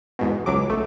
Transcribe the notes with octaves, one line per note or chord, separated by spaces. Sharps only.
E2 G#2 B2
C#2 C#3 F#3 D6
B1 A3